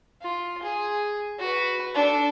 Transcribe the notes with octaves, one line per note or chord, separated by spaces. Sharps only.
F4
G#4
F#4 B4
D4 A4